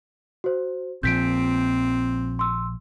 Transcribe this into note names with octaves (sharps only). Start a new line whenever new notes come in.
F#4 C5
A#1 A#2 F3 C4 G6 B6 D7
C6 E6